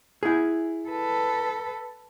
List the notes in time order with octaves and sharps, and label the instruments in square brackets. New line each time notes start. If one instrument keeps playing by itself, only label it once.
[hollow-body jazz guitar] E4 G#4
[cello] A4 B4